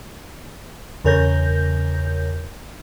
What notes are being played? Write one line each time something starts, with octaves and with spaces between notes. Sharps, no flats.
E2 C#3 A#4 C#5 G6 A#6